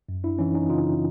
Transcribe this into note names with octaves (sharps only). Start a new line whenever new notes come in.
F#2
D4 E4
E3 C#4 D#4
C#4 D#4
C#3 D#4 F4